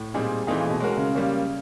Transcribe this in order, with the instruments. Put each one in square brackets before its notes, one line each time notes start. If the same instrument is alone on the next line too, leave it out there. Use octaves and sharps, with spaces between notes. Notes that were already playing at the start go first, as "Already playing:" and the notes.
Already playing: [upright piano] A2
[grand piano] A#2 G3 C4 D#4 G#4
[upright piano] A#2 [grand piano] E3 A3 C4 D#4 G#4
[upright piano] A#2
B2
[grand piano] G#3 C#4 F#4 A#4
[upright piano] C#3
[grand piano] G3 A#3 C#4